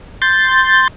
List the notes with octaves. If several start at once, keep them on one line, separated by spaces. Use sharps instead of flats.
C6 G6 A6